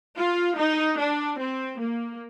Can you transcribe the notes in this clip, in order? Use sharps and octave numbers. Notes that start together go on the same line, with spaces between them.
F4
D#4
D4
C4
A#3